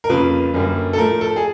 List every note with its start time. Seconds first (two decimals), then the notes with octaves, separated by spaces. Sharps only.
0.04 A#4
0.09 F2 C#3 F3 A#3 B4
0.54 F#2 D3 G3 A#3
0.93 A4
0.98 A2 F3 A3 A#4
1.21 A4
1.36 G#4